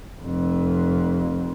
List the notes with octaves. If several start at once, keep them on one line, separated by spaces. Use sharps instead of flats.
F1 F2